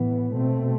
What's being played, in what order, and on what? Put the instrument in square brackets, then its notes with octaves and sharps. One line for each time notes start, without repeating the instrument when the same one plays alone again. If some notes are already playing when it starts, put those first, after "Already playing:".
Already playing: [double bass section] A2 E3 B3
B2 A3 C4